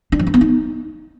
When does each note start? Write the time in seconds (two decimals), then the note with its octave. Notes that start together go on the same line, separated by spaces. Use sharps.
0.12 D4
0.19 F3
0.27 D4
0.34 B3
0.41 D#4